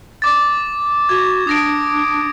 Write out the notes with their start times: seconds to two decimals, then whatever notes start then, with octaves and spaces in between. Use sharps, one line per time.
0.22 D6 A6
1.09 F#4 G#6
1.47 D4 D#6 A#6 D7